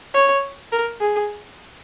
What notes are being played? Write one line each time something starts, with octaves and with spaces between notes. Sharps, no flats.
C#5
A#4
G#4